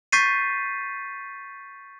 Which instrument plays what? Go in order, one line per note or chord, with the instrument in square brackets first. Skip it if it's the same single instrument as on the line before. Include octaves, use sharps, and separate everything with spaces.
[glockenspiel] C#6 G6 A6 B6 C7 D#7